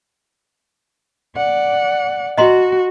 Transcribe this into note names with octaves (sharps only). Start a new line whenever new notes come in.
D5 F#5
F#4 D#5 A#5 C6